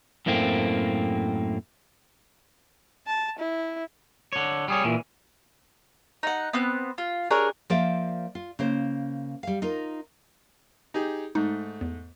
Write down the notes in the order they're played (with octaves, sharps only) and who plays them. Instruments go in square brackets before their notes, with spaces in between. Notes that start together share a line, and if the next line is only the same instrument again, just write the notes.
[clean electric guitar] F#2 A2 A3 A#3 C4
[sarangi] A5
E4
[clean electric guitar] D3 C#5
G3 G#4 C#5
A#2 E3
[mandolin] D#4 F#5
B3 C4 F#6
F4
D4 G#4 A#4 C#5
[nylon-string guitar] F3 A#3 C5 D5 E5 F5
F4
C#3 A#3 C5
G3 F5
D#4 F4 A#4
[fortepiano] D#4 G4 G#4
[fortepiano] G#2 A3 [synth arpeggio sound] D#4
[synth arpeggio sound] E2